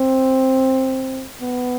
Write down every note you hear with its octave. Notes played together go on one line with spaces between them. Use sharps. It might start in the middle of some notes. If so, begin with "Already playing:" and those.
Already playing: C4
B3